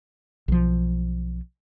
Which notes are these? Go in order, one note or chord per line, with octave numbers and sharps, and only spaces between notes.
B1 F3